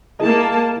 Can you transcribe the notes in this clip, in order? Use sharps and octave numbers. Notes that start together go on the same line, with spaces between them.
A#3 E4 G#4 D#5 A5